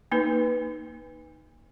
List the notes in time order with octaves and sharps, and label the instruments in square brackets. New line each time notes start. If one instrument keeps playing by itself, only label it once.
[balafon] A#3 D#4 B4